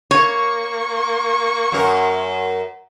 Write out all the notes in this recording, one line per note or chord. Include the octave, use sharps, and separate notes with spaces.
A#3 C#5 C#6
F#2 A#4